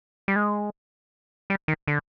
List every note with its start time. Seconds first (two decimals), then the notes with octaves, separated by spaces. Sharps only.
0.28 G3
0.36 G#3
1.50 G3
1.68 D#3
1.88 D3